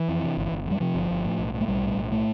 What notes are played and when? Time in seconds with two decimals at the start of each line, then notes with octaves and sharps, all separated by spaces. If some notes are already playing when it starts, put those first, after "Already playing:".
Already playing: E3
0.08 F2
0.23 C3
0.37 G1
0.52 G1
0.66 F2 G3
0.80 C3 F3
0.95 G1
1.11 G1
1.25 A2
1.39 B1
1.54 A2
1.61 A3
1.68 B1 G3
1.84 A2
1.97 B1
2.12 A2 A3